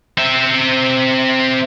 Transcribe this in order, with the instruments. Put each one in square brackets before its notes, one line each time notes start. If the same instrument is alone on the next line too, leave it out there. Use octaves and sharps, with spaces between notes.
[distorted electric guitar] C4 E5